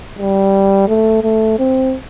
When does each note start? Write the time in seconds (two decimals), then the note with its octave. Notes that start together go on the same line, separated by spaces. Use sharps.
0.19 G3
0.88 A3
1.23 A3
1.59 C4